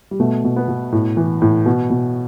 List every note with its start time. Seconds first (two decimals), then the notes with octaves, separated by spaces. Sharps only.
0.11 G3
0.20 B2 A3
0.44 B2
0.56 B3
0.68 B2
0.92 A2
1.17 E3
1.42 A2
1.66 B2
1.90 B2